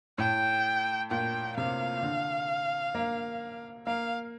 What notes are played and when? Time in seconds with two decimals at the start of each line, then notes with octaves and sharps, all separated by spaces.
0.18 A2 G5
1.11 A#2 G5
1.57 C3 F5
2.03 D3
2.95 A#3
3.87 A#3 F5